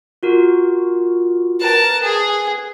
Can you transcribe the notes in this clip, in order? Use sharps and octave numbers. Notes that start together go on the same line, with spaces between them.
F4 F#4 A#4
A#4 B4 A5
G#4